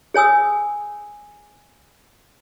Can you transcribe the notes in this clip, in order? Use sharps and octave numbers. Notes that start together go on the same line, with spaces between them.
G#4 C#5 G#5 D#6 E6